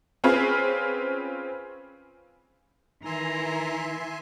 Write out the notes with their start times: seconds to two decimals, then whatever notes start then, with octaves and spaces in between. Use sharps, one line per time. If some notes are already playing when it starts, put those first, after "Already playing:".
0.24 C4 C#4 F4 G#4 B4
3.05 D#3 E3 E5 G#5 A#5 C6